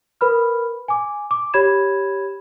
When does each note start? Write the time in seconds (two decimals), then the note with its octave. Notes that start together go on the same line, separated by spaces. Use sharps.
0.21 A#4 B4 B5 F6
0.88 G#5 D6
1.31 D6
1.54 G4 C#5 B5 G#6 E7